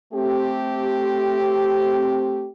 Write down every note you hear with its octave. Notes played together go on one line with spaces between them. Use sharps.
A3 C4 G4